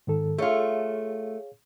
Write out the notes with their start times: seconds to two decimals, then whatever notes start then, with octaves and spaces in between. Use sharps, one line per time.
0.07 G#2 D#3 A4
0.38 A3 F4 G#4 C#5 F5